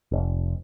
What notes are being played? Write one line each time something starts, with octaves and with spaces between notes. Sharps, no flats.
F1